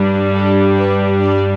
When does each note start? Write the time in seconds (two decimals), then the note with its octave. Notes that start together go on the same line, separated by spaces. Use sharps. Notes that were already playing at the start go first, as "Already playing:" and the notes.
Already playing: G2 G3 D4
0.33 A4
0.78 B4
1.21 D5